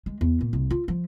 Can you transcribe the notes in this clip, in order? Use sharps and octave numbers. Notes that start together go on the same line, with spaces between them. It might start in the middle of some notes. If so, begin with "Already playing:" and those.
G#3
E2
A#2
C2
F4
F3